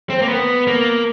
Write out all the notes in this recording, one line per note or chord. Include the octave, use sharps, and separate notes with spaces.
C4
A#3
B3
A#3